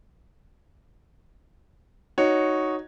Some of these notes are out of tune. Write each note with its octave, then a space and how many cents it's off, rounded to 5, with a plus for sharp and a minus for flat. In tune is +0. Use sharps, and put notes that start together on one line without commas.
D#4 +0 F#4 +0 C#5 +0